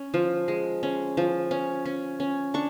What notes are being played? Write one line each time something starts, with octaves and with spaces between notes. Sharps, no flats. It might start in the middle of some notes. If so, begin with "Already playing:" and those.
Already playing: C#4
F3
G#3
C#4
F3
C#4
C#4
C#4
D4 C#6